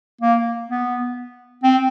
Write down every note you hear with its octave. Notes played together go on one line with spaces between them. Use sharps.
A#3
B3
C4